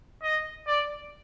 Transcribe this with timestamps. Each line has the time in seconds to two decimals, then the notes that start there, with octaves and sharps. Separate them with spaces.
0.23 D#5
0.67 D5